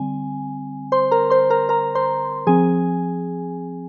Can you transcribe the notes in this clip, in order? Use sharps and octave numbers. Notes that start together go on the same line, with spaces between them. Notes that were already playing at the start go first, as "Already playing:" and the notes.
Already playing: D3 G3 C4 G#5
C5 C6
A#4 A#5
C5 C6
A#4 A#5
A#4 A#5
C5 C6
F3 C4 G#4 G#5